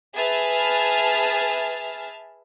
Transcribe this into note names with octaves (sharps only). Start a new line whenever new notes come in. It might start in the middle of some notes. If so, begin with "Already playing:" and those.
G#4 B4 E5 A5 F6 A6